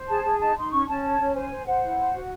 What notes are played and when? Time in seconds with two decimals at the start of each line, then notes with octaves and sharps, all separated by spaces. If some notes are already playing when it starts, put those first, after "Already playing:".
Already playing: C5
0.09 G#4 A5
0.24 G#4
0.40 D#4 A5
0.56 D#4 C6
0.72 C#4 C#6
0.87 C#4 A5
1.03 C#5
1.19 C#4
1.34 C5 G#5
1.50 C5
1.66 C5 F#5
1.82 E4
1.98 C5
2.13 F#4